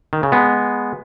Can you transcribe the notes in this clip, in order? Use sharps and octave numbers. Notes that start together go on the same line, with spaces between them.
D#3
C#3
G#3 B3